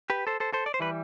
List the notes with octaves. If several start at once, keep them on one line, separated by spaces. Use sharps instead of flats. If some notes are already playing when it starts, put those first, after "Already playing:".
G4 B4
A4 C5
A4 C5
A4 C5
D5
C5
E3 G3 B4